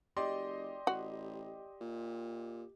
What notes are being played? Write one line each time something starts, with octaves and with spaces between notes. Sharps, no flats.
F#1 G4 D5 D#5 C6
A1 F#4
A#2